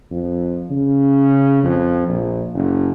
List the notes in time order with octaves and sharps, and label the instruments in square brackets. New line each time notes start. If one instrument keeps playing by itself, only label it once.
[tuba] F2
C#3
F2
A#1
F#1